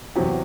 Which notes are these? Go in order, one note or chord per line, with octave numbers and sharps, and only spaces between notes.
E2 C3 F#3 G4